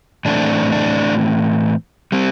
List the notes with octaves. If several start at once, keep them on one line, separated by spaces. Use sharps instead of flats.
A2 E3 A3 C4 D4
D4
G3 C4